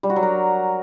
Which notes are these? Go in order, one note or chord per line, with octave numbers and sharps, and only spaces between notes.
G3
F#4
F#3
A#4